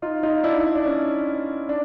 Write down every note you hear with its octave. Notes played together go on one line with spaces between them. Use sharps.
D#4 F4
D#4 F4
D4 E4
D4
D4
C#4
D4